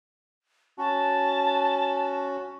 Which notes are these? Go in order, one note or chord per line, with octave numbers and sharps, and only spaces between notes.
C#4 F#4 A5